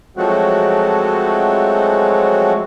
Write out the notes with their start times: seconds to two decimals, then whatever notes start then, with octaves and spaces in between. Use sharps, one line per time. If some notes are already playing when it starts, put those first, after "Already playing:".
0.17 F3 F#3 G#3 A3 C4 F#4